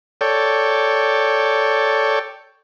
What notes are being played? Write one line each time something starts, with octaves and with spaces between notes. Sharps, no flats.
A4 C#5 D5 G5